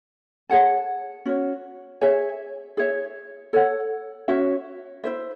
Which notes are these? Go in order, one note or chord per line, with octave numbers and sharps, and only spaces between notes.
G#4 C#5 F#5 A5
C#4 F#4 C#5
G#4 C#5 E5 G#5
E4 G#4 C#5 E5
A4 C#5 F#5
C#4 F#4 C#5 E5
E4 C5 E5